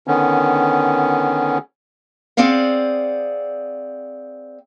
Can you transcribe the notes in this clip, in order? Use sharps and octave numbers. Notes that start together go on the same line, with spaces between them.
D3 D#3 B3 C#4
C4 G#4 D5 F5 F#5